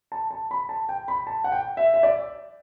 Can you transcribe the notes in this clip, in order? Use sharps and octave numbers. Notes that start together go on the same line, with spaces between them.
A5
A5
B5
A5
G5
B5
A5
F#5
G5
E5
E5
D5